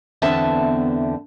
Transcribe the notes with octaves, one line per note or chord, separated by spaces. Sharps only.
E2 D3 B3 C4 E5 A5